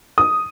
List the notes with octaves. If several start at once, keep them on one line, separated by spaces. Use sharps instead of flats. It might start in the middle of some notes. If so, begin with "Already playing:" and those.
D#6